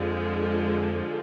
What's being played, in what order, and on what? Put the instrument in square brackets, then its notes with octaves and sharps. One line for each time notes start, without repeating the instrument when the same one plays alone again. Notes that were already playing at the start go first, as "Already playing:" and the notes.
Already playing: [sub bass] F2 [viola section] D3 F3 G#3